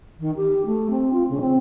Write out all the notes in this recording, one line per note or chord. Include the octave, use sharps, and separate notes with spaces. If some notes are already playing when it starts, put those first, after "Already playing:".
D#3
G4
A3
C4
F4
C#3
C4